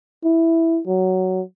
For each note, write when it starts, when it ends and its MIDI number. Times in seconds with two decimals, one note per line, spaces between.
0.24 0.80 64
0.87 1.42 54